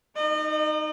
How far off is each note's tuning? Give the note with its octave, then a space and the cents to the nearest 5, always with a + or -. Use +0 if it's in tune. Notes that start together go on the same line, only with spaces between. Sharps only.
D#4 +0 D#5 -40